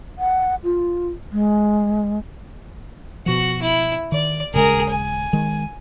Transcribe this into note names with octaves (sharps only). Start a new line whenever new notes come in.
F#5
F4
G#3
B2 F3 F#4
E4
D#3 D5
D#1 C#3 G#3 G#4 A#4
G#5
D#3 G#3